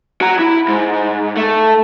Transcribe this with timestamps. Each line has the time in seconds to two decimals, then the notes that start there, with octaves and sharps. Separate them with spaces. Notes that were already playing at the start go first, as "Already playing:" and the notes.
0.21 F#4 A#5
0.39 E4
0.68 G#2
1.37 A3